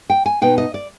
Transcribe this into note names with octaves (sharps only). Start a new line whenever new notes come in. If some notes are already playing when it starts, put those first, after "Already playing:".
G5
G#5
B2 B3 D#4 G5
D#5
D5